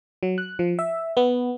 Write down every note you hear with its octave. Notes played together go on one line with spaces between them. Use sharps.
F#3
F#6
F3
E5
B3